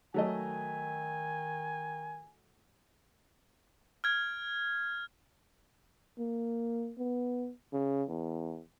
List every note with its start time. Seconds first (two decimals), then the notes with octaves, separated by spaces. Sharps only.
0.14 D#3 F#3 A3 D#5 G#5
4.04 F6 G#6
6.18 A#3
6.98 B3
7.73 C#3
8.09 E2